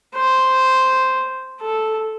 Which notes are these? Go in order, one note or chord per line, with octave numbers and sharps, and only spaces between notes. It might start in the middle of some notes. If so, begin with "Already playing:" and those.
C5
A4